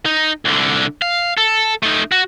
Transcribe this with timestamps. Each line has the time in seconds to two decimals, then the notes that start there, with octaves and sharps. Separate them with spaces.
0.06 D#4
0.45 C2 D3
1.02 F5
1.38 A4
1.83 A3 D#4
2.12 F#4